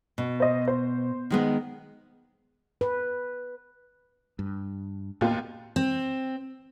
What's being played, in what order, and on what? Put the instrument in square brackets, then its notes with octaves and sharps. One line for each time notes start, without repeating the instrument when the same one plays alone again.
[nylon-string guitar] B2
[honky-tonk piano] C5 D#5
C5
[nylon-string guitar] D#3 G#3 B3
[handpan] B4
[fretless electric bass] G2
[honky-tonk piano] D#2 F4 [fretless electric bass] A2 B3
[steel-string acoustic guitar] C4